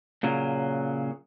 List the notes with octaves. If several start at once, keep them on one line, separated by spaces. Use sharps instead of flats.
A#2 C#3 F#3